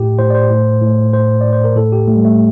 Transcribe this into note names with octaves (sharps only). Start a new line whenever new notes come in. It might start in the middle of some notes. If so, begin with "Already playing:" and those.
Already playing: A2 G4
A2 C5
D5
C5
A2
A2
A2 C5
A2 D5
C5
A#4
A2 A4
G4
A2 A3
G3
A3